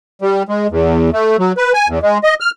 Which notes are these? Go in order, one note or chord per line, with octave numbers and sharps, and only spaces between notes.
G3
G#3
E2
A3
F#3
B4
G#5
E2
G#3
D#5
F6